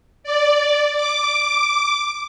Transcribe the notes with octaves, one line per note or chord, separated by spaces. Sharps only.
D5
D6